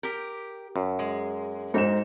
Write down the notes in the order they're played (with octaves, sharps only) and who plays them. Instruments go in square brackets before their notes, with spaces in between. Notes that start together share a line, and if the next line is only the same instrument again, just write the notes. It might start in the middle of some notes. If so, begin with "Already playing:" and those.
[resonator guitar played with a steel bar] G4 A#4
[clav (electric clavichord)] F#2
[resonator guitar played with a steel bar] G#3
[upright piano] G#2 D#4 E7 [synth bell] F#4 A4 C5